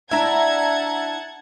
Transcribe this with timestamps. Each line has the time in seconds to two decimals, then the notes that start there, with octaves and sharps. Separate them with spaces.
0.11 D4 E4 E5 F#5 A5 A#5 G#6